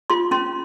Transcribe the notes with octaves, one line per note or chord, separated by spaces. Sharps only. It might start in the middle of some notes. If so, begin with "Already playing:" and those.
F4 C6
C#4 C6